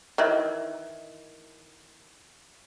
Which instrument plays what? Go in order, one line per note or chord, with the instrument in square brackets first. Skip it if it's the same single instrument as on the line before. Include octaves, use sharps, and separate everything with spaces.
[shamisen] D#3 E3 E4